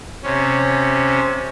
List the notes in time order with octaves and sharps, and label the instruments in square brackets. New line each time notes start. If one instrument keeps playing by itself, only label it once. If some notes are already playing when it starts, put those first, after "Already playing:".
[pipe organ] C3 C#4